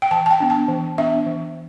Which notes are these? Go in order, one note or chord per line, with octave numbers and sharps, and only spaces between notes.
G5
E3 A5
A5
G5
B3 D4
A5
E3
B3 D4 E5
E3